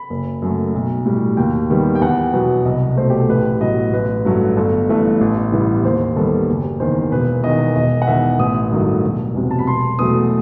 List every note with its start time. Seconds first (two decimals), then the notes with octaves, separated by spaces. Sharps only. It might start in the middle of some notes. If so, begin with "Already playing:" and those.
Already playing: B5
0.10 F#1
0.42 F#2 F#3 A3
0.74 B1
1.06 A2 G3
1.37 D#2 G5
1.70 D#3 G3 B3
1.95 G5
2.01 E2 F#5
2.33 B2 F#3 B3
2.65 C2 D#5
2.97 B2 A3 C5
3.10 G4
3.20 A4
3.29 A1 B4
3.61 A2 F#3 B3 D#5
3.93 A1 B4
4.25 G2 F#3 A3
4.57 G1 A4
4.89 G2 E3 A3
5.21 A1
5.52 A2 E3 G3 B3
5.84 D#2 C5
6.16 D#3 G3 B3 A4
6.49 F#1
6.80 E2 D#3 C5
7.11 E1 B4
7.43 E2 D#3 D#5
7.75 E1 D#5
8.02 F#5
8.07 E2 D#3 E5
8.39 A1 D#6
8.71 G2 D#3 F#3 A3
9.04 E1
9.35 E2 C3 F#3
9.51 A5
9.59 B5
9.67 E1 C6
9.99 E2 B2 F#3 A3 D#6